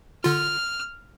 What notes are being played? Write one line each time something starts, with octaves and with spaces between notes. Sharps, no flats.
D3 F4 F6